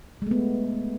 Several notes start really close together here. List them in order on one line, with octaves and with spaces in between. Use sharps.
G#3 A3 B3